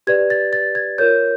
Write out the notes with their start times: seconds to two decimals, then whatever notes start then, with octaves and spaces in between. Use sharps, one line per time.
0.07 G4 B4 D5 G#6
0.30 A6
0.53 A6
0.75 G#6
0.98 F4 A#4 C#5 G6